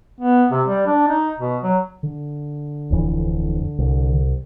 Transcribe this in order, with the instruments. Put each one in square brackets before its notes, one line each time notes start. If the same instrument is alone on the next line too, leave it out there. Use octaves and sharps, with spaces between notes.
[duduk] B3
C3
G3
D4
D#4
B2
F#3
[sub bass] D3
[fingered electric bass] D1 F2 E3
C2